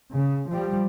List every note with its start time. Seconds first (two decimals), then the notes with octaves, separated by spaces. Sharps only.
0.13 C#3
0.49 F3 G3